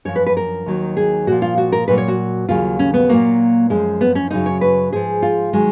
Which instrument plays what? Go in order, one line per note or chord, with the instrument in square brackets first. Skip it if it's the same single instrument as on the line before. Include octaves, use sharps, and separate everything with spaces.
[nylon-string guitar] F#2 F3 C#5
B4
B4
A#4
D#2 D#3 F#3
G#4
A#2 F3 F#4
F4
F#4
A#4
A#2 F#3 B4
C#5
F#4
D#2 C#3 F#3 F4
C#4
B3
A#2 F#3 A#3
F#2 F3 G#3
B3
C#4
F#2 C#3 F#3 D#4
C#5
B4
G#2 F3 G#4
F4
D#3 F#3 G#3